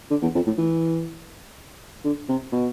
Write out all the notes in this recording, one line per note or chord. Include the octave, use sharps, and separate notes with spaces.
D3
E2
F2
A2
E3
D3
C3
B2